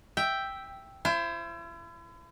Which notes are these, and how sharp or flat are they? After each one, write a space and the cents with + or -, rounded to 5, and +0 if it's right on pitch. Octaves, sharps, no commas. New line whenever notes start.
E5 +0 G5 +0
E4 +40 C5 +20